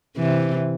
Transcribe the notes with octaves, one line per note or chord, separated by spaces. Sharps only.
C3 E3